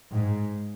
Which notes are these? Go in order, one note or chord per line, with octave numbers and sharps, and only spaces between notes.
G#2